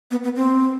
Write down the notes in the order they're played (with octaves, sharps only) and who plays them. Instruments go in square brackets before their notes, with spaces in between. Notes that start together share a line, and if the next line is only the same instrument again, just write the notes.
[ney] B3
B3
C4